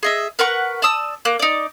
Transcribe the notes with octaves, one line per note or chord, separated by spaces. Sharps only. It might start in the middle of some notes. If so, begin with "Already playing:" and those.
G#4 D#5 E5
A#4 B4 F#5 C#6
D5 A5 D#6 E6
A#3 F#6
D#4 D5